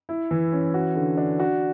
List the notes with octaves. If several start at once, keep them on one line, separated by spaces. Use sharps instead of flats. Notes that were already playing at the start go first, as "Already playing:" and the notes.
E4
E3
C#4
F#4
D3
D4
F#4